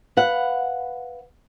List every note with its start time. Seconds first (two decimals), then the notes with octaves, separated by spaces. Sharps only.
0.17 B4 F5 F#5